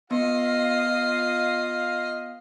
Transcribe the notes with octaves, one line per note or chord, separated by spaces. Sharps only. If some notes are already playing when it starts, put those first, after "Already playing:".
B3 F4 D#5 F5 C7